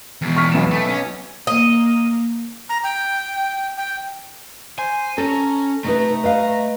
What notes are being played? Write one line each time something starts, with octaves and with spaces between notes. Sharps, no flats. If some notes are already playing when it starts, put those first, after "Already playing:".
E2 B2
C#6 F6 B6
B1 B3 E7
A3
C#4
A#3 D#5
A#5
G5
G5
C5 G#5
C#4 A4 A#5
C3 A3 D#4 B4 A#5
B4 D#5 F5